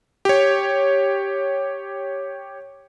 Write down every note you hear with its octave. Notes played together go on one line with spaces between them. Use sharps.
G4 C#5